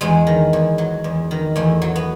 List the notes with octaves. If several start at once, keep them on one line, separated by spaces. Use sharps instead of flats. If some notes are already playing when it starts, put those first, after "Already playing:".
E2 G#3
D#3
E2
F#3
E2
D#3
E2 A3
F#3
B3